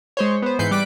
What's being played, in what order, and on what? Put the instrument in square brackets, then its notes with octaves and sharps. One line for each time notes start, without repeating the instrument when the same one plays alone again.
[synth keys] G#3 C5 C#5
B3 C5
G#2 E3 B4 G6 C7 C#7
G3 D6 F#6 B6 D7